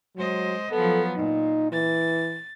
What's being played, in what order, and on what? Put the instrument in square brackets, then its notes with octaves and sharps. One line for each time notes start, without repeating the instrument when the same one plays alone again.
[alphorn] F#3 [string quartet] G#3 C5 D#5
[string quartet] F3 F#3 B3 [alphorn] A4
[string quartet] A#2 [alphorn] D#4
[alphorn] E3 [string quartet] A6